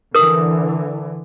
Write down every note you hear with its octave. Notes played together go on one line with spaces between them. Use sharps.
D3 E3 A#4 D#6